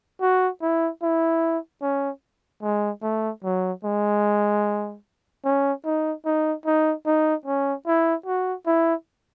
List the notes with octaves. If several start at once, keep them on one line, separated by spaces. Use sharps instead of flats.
F#4
E4
E4
C#4
G#3
A3
F#3
G#3
C#4
D#4
D#4
D#4
D#4
C#4
E4
F#4
E4